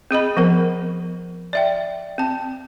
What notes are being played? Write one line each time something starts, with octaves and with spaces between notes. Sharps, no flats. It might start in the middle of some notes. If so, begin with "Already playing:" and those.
C4 G#4 D#5 B5
F3 B3 A#4
D5 E5 G5
C4 A5